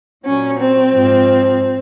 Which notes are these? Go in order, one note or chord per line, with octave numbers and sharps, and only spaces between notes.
A#2 F#3 C#4
C4
G#2 F3